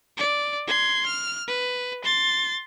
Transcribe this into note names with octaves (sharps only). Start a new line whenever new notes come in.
D5
C6 G#6
F6
B4
C6 A6